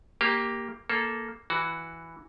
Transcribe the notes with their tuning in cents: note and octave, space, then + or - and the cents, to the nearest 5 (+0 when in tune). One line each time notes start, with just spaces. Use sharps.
A#3 +0 G4 +10
A#3 +0 A4 -10
E3 +0 F#4 +0